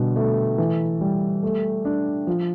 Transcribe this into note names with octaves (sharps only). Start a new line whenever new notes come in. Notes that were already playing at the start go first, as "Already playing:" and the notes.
Already playing: B2 D3 G3
A3
E3
G3
A3
D4
F3